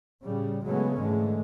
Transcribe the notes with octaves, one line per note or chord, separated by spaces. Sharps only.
A2 C#3 G3
C#3 F#3 G#3 A3 B3 C#4
G#2 D3 E3 G#3 A3